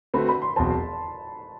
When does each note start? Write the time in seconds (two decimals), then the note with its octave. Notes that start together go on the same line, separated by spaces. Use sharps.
0.14 D3 A3 C4 F#4 B4 B5
0.29 B5
0.42 C6
0.56 E1 E2 B2 F#3 C4 A5